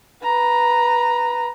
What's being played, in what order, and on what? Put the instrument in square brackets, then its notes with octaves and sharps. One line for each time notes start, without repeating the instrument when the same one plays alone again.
[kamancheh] B4 A#5